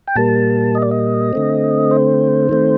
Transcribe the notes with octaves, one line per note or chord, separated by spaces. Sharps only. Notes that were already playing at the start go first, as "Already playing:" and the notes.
G5
A#2 G3 A#3 A5
D#5
D5
D#5
D3 A3 C4
C5
D#3 A3 C4